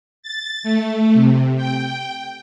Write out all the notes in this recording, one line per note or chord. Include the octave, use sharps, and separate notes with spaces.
A6
A3
C3
G5